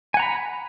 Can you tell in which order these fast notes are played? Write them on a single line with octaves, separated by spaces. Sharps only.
G#5 F#5 A#5 B5